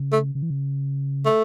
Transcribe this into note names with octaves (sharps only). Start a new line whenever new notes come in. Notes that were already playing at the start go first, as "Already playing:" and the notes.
Already playing: C#3
A3
C#3
E3
C#3
A3